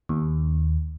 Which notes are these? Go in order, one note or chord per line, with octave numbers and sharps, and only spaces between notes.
D#2